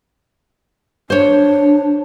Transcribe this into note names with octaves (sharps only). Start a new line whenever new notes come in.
D4 C5 C#5